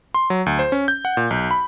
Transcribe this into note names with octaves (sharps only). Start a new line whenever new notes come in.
C6
F#3
D2
C5
C#4
G6
F#5
A#2
B1
B5